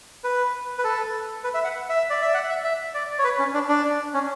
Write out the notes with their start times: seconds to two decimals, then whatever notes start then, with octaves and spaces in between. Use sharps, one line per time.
0.24 B4
0.78 B4
0.84 A4
1.44 B4
1.54 E5
1.64 F#5
1.89 E5
2.10 D5
2.22 E5
2.34 F#5
2.49 E5
2.64 E5
2.94 D5
3.19 C#5
3.24 B4
3.39 C#4
3.54 D4
3.69 D4
4.14 C#4